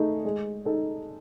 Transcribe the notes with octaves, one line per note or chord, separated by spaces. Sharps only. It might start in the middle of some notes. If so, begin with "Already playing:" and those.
Already playing: A3 D#4 G#4
G#3
D#4 A4